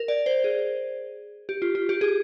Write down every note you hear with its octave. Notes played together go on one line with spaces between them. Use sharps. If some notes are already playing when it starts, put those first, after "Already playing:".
Already playing: A#4
D5
C5
G#4
G4
F4
F4
G4
G#4